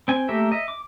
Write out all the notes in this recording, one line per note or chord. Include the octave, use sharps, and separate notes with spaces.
C4 G#5
A3 A#3 G4 A#4 E5
D#5 E5
D6